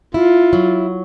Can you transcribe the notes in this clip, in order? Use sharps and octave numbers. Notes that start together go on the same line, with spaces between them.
E4 F4
F#3